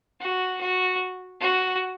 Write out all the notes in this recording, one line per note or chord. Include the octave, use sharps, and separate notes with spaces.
F#4
F#4
F#4